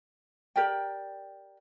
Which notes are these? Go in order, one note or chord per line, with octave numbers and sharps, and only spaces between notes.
G4 A#4 D5 G5